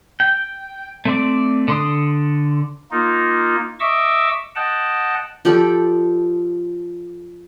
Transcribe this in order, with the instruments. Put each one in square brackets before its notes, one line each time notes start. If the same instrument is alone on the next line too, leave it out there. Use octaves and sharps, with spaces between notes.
[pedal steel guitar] G5
A3 C4 D5
D3 C6 D#6
[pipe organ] A#3 D#4 F4
D#5 E5 C#6 D6 E6
D#5 F#5 G5 A5
[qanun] F3 G4 A4 D5